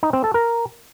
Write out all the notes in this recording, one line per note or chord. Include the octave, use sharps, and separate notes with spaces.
D#4
C4
A4
A#4